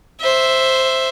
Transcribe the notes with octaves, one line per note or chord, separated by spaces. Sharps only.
C5 E5